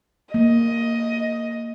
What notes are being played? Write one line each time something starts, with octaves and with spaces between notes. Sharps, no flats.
A#3 D#5